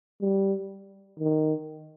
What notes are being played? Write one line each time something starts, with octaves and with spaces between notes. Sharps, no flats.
G3
D#3